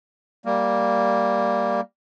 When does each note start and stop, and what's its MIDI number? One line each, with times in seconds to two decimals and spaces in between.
0.45 1.81 55
0.45 1.81 58